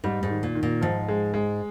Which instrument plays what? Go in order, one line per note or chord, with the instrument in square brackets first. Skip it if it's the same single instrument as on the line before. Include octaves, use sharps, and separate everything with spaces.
[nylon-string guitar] G#2 [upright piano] G3
[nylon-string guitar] G#2
[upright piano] D#3
[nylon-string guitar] A#2
[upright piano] D#3
[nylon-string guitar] A#2
[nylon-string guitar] G#2 [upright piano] F3
[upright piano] G#3
G#3